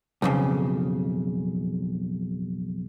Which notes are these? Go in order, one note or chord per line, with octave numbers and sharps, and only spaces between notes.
B1 F2 C#3